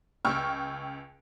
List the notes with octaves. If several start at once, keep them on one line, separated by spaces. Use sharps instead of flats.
C#2 G5 C#6 E6 F6